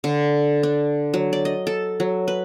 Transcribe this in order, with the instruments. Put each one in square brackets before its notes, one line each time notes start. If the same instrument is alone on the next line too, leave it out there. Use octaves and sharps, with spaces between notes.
[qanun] D3
D4
F#3
D5
D#5
A4
F#3
B4